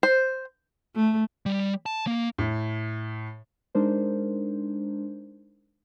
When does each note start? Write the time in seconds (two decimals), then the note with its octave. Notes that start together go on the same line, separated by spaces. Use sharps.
0.03 C5
0.95 A3
1.46 G3
1.86 A5
2.07 A#3
2.38 A2
3.75 G#3 D4 D#4 A#4 C5